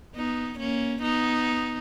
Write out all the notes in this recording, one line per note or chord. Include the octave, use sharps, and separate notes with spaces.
B3 D#4
A#3 C#4
B3 D#4